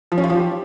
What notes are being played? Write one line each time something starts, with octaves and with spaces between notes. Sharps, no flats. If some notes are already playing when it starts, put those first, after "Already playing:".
F3
C#4
F4
F3
G4